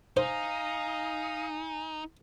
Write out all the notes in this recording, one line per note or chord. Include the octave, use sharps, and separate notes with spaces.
D#4 C5 F5 G#5 A#5 D#6